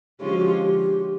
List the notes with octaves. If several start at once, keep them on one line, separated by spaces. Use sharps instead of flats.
D3 F3 G#3 C#4 F4 G4
F#4
G4